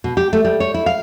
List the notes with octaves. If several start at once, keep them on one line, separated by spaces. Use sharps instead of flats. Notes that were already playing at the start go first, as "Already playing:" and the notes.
B2
G4
A3
G3
C#5
E4
F5